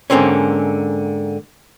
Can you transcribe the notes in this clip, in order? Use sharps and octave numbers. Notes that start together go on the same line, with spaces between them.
G#2 D3 A#3 C4 C#4